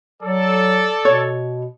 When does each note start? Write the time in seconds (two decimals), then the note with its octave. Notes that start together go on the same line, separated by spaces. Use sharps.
0.23 F#3 A4 D5
1.05 B2 C#5